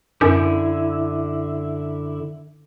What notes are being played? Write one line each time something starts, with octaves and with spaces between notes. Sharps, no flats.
F#2 D3 E4